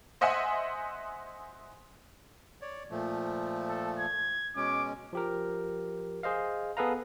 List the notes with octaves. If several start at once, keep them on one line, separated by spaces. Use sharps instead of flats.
C5 D#5 E5 F#5 G#5 C6
C#5 D5
A#2 F3 A3
A4
G#6
B2 G#3 C#4 D6
F3 G4 A#4
G#4 C5 D#5 F5
B3 G#4 A4 B4 F5 A#5